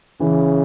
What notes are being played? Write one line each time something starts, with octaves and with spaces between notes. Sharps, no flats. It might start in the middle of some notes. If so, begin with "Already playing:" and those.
C#3 E3